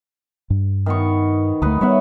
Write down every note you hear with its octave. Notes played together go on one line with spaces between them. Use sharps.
G2
D#3 B3 C#6
D2 A3 D#4 B4
G3 B3 C#5 E5 F#5